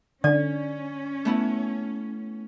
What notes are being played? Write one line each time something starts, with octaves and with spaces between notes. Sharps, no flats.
D3 C#4 D5 G#5
A3 B3 E4